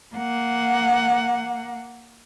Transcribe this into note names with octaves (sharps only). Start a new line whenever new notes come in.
A#3 F#5